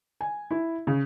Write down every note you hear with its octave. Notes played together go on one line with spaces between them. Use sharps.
G#5
E4
C#3